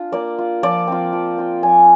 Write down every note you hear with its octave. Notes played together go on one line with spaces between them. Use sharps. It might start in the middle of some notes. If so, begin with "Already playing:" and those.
Already playing: D4 F4
A#3 D5
F4
F3 D5
C4 F4
F3
C4 F4
F3 G#5